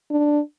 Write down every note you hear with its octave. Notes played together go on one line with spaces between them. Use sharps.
D4